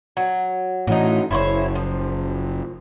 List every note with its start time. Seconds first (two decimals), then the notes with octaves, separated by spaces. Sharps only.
0.17 F#3
0.87 A2 E3 F#3 D#4
1.31 F#1 E4 C5 C#5
1.75 F3